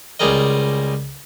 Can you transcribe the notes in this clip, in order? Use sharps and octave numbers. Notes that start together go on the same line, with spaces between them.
C#2 G3 G#4 A#4 D#5